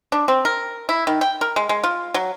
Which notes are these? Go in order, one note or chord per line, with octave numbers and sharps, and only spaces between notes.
D4
C4
A#4
E4
D#3
G5
A#4
G#3
G#3
F4
F#3